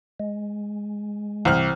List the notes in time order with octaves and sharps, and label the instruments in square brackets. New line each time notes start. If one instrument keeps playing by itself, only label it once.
[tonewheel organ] G#3
[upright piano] C2 F6 [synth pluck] E3 C5 G5